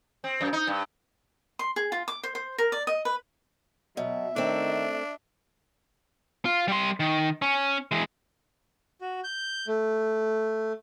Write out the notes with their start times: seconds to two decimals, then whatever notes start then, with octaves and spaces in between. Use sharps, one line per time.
0.24 C4
0.41 F#2
0.53 D#4
0.67 G2
1.59 C6
1.76 G#4
1.92 F4
2.08 D6
2.23 C5
2.35 C5
2.58 A#4
2.72 D5
2.87 D#5
3.05 B4
3.97 B2 F#3 E5
4.36 D#3 A3 C4 D4
6.45 F4
6.68 G3 C6
7.00 D#3
7.42 C#4
7.92 E3 G#3
9.01 F#4
9.24 G6
9.67 A3